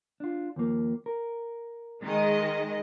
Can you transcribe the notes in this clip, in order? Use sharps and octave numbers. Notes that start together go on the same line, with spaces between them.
D4 F4
D#2 F3 A#3
A#4
D#3 G#3 D#5